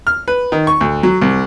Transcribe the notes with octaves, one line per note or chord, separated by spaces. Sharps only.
F6
B4
D#3
C#6
D2
F#3
C2